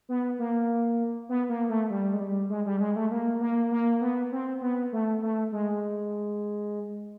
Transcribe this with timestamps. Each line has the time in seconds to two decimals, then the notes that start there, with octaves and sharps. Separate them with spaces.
0.09 B3
0.39 A#3
1.29 B3
1.49 A#3
1.69 A3
1.90 G3
2.13 G#3
2.20 G3
2.50 G#3
2.66 G3
2.80 G#3
2.96 A3
3.11 A#3
3.41 A#3
3.71 A#3
4.01 B3
4.32 C4
4.61 B3
4.92 A3
5.22 A3
5.52 G#3